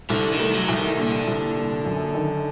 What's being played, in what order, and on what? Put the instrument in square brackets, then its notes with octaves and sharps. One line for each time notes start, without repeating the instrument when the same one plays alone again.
[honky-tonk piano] C2 [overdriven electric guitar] D3
[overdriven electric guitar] D#3
[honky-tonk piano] A3
[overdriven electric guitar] F#3
[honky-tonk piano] C2
[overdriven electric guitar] D#3
[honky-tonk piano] A#2 [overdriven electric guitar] D3
[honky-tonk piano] C2
A#2
F#2
D#3